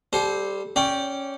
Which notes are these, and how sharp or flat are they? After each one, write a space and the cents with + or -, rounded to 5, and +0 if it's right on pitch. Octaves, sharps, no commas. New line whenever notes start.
G3 +0 A4 -30 C5 +0
C#4 -5 D5 -20 G5 +0